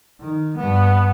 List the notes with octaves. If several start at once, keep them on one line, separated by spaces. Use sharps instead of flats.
D#3
G2 B3